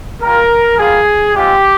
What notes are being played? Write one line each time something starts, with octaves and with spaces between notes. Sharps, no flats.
G3 A#3 F4 A#4
G3 A#3 F4 G#4
G#3 C4 F4 G4